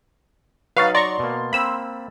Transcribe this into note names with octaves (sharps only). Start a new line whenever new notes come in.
F#3 D#4 B4 F5 C#6 A6
D5 A#5 C6 C#6
B2 A#3
A#3 C4 B5 E6